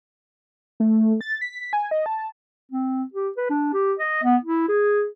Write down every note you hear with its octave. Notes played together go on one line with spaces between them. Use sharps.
A3
A6
B6
G#5
D#5
A5
C4
G4
B4
D4
G4
D#5
B3
E4
G#4